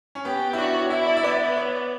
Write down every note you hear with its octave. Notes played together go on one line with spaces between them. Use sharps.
C#4
B3 G4
E4
D4 F#4
C#5
E4 E5
D5
E5
B3 D5
C#5